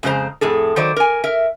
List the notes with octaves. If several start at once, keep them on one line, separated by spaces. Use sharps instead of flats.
F2 C#3 G#3 F#4 C5 A#5
F2 A2 G#4 A4
D#3 F#3 C5 D5
A#4 G#5
A#4 E5